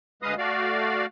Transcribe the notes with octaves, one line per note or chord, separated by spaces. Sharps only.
D2 G#3 B4 D#5 F5 D#6
A3 F#4 D5 F5